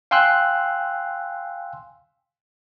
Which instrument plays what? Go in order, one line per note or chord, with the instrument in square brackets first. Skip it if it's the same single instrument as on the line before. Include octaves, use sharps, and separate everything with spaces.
[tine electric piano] F5 G5 G#5 C6 E6 F#6